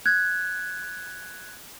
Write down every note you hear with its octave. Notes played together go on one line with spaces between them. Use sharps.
F#6 G#6